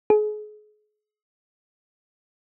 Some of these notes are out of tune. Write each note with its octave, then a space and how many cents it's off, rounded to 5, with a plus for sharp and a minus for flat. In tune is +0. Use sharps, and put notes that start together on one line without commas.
G#4 +35